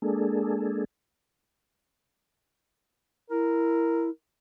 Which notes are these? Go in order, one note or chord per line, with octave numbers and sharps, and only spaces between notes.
G#3 A#3 D4 G#4 A4
E4 A#4